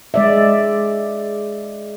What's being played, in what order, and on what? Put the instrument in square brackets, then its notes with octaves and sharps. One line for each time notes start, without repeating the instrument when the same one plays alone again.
[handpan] G#3 D5 E5